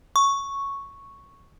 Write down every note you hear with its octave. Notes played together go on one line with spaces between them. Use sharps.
C#6